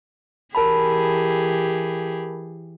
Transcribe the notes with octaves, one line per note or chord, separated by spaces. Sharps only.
E3 G4 G#4 A#4 A5 B5